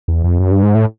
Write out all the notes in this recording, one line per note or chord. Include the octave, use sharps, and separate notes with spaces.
E2
F2
F#2
G2
G#2
A2